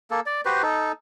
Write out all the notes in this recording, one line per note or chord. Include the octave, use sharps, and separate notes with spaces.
A#3 A4
D5
F#4 G4 B4 C5
D#4 A4